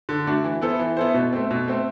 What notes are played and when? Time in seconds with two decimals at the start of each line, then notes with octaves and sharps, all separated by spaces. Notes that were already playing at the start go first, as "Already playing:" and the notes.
0.09 D3
0.27 A3 D4 F#4
0.44 E3
0.62 B3 E4 A4 C5
0.79 E3
0.97 B3 E4 A4 C5
1.14 B2
1.33 A3 C4
1.51 B2
1.68 A3 C4